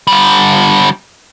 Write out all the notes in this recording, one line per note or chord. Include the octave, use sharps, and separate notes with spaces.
D3 G3